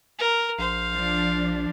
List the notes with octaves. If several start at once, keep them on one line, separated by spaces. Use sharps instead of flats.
A#4
A#1 C5 F5
F3 D4